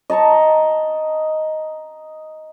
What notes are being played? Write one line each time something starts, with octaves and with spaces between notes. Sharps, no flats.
D#5 A5 A#5 C#6